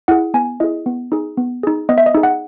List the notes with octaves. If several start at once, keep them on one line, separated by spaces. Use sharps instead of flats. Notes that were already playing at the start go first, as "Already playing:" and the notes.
E4 G#4 F#5
B3 G#5
E4 G#4 D#5
B3
D#4 G#4
B3
D#4 G#4
B3 D#5
E5
D#5
D#4 G#4
F#5